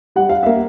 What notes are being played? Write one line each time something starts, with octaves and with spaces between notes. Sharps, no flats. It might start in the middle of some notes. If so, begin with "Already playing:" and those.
G3 F#5
F5
A#3 E5